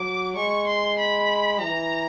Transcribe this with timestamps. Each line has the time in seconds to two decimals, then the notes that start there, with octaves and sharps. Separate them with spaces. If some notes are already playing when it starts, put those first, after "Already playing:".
Already playing: F#3 D6
0.36 G#3 C#6
0.67 C6
0.99 B5
1.61 E3 A#5